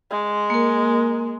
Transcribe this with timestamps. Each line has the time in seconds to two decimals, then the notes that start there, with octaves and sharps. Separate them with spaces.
0.11 G#3
0.50 A#3 A#4